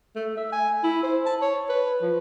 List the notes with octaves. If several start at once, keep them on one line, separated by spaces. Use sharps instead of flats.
A3
E5
G#5
E4
C5
A5
C#5
B4
F3